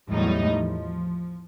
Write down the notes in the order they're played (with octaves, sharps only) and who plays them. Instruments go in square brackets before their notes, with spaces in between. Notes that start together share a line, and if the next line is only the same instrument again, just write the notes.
[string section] E2 A2 F#3 G3 D#4
F3